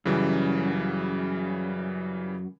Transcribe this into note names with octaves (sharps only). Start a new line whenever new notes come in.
F#2 C#3 E3 G3